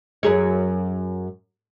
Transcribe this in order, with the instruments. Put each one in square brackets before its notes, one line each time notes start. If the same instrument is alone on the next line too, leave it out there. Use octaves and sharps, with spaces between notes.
[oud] F#2 G#4 C#5